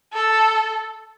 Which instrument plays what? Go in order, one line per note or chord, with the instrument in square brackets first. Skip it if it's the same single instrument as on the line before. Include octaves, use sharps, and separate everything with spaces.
[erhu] A4